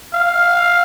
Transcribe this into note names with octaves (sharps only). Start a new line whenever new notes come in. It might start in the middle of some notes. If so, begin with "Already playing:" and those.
F5